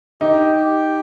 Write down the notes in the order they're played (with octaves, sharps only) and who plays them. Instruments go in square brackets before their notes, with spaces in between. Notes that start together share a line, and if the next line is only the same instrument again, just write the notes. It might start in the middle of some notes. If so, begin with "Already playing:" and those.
[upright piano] D#4 [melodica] G4
[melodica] G4